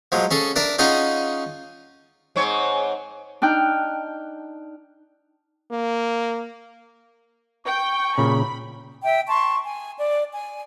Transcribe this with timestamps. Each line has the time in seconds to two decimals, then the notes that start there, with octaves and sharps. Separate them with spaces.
0.12 F3 F#3 G#3
0.31 C#4 G#4 A4
0.56 D4 A#4 D5 E5
0.79 C#4 D#4 F4 G#4 D#5 F#5
2.36 G#2 C4 C#5
3.42 D4 D#4 G5 F6 F#6
5.71 A#3
7.66 G5 C#6
8.18 A#2 C#3 B5
9.03 E5 G5
9.27 A5 C6 C#6
9.64 G#5
10.00 D5
10.34 G#5